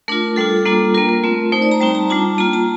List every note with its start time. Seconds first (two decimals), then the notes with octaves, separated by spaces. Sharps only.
0.08 A3 D4 F4 A#4
0.36 G3 D4 F4 A4
0.65 G3 A#3 D4 F4
0.94 A#3 F4 A#4
1.09 A#4
1.24 A3 C4 F4
1.52 A3 D#4 C5
1.62 D5
1.71 A#5
1.81 G3 C4 D#4 A5
1.95 A#5
2.10 G3 D4 F4 A5
2.38 A#3 F4 A#5
2.53 A5